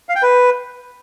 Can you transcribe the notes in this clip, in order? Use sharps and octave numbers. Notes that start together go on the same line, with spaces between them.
F5
G5
B4